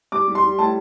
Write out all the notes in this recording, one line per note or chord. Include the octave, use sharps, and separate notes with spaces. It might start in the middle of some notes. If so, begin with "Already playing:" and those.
G3 D6
G3
C6
G3
A2 A5